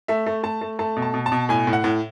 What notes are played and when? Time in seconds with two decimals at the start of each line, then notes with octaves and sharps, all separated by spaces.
0.08 A3 E5
0.27 A3
0.43 A3 A5
0.61 A3
0.79 A3 A5
0.97 B2
1.02 A5
1.14 B2
1.26 A5
1.32 B2
1.49 A2 G#5
1.67 A2
1.73 F#5
1.84 A2